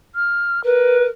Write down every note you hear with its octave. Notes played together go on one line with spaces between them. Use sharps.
F6
A#4 B4